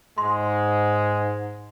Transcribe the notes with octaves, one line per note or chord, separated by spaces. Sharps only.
G#2 G#3 C6